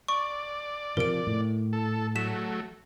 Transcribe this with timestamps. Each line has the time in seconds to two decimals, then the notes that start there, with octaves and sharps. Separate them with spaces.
0.08 D5 C#6
0.97 C3 F3 A#4 D7
1.27 A2
1.73 A4
2.15 F#3 A3 B6 E7